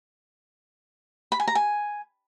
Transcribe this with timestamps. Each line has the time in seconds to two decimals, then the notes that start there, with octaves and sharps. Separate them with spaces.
1.32 B5
1.40 G#5
1.48 A#5
1.55 G#5